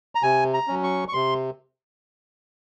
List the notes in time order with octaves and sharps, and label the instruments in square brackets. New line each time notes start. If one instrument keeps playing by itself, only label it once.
[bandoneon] A#5
C3 G#5
A#5
F#3 C#4
C#6
C#6
C3 C6